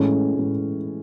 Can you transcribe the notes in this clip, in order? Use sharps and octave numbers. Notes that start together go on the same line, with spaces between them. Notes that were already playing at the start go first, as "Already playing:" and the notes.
Already playing: A2 E3 G#3 C#4
A2 E3 G#3